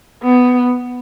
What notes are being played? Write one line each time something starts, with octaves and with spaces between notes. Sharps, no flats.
B3